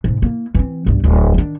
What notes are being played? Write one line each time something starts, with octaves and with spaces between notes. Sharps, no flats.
G#2 B2
A#3 E4
E3 C4
B1 G2
D1
D#3 D4